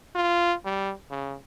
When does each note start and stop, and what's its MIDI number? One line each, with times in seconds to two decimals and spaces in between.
0.15 0.54 65
0.65 0.92 55
1.11 1.36 49